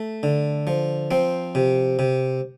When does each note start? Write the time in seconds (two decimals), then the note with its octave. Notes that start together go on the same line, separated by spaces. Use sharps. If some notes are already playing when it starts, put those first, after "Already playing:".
Already playing: A3
0.23 D3
0.67 F3
1.11 F3 C4
1.55 C3
1.99 C3